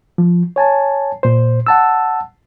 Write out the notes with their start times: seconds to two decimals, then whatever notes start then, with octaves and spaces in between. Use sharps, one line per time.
0.18 F3
0.56 C#5 G#5 A5
1.23 A#2 C5
1.67 F#5 A5 E6